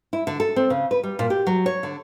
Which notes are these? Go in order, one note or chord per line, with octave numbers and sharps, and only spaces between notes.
E4
D3
A4
C4
C#3
B4
G3
A#2
G4
F#3
C#5
D3